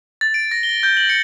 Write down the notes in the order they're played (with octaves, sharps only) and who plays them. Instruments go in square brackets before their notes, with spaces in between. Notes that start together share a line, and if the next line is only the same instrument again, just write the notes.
[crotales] A6
D7
A#6
G7
G6
F#7
C#7